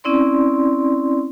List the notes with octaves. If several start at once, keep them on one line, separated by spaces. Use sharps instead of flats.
C4 C#4 E4 D5 C6